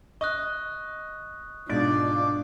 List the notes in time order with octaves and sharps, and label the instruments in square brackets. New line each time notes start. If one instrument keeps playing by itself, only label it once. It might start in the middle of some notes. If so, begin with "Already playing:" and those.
[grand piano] D#5 [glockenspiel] C#6 D#6 F#6
[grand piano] G#2 B2 [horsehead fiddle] D4 F4 [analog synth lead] D5